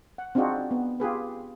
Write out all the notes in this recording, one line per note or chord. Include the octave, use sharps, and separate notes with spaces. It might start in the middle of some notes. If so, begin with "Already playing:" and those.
F#5
C4 D4 D#4 F4 F#4 G#4
B3
F4 G4 G#4 B4